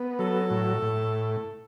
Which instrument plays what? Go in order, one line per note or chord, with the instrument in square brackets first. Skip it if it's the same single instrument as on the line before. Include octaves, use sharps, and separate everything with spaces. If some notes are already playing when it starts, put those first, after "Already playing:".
Already playing: [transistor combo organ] B3
[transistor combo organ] F#3 [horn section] A4
[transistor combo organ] A2
A2